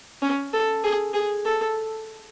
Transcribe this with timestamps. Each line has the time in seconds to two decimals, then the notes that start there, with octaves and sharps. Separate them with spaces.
0.22 C#4
0.53 A4
0.83 G#4
1.14 G#4
1.45 A4